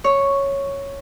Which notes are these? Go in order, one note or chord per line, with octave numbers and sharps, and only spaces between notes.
C#5